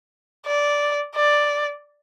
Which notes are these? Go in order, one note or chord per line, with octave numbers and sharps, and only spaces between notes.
D5
D5